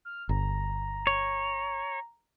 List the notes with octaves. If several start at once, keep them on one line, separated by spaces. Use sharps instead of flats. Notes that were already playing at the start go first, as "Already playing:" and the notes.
F6
G1 A#5
C#5